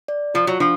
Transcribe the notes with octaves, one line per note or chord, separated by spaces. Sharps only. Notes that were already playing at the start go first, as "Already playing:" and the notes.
D5
F3 F4
F#3
F3 D4